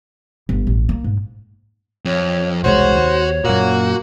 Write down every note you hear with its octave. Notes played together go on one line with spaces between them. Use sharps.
G1
A1
A#3
G#2
F2 C#5
E1 C2 G#3 F#4 C5 C#5
D#2
F#2 A#2 A#3 F#4